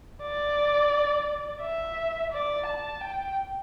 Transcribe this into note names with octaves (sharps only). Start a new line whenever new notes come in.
D5
E5
D5
A5
G5